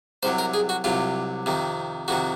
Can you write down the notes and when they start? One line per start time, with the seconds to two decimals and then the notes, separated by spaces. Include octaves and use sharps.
0.23 C2 C3 F#3 C5
0.39 A#4
0.54 G#4
0.69 F#4
0.84 C2 C3 F#3 F4
1.46 F2 C3 D#3
2.08 F2 C3 D#3 F#4